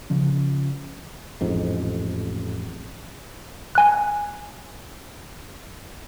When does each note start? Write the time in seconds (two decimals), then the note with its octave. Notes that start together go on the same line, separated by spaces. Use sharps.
0.10 C#3 F3 C#4
1.41 A1 F2 G#2
3.75 G#5 F#6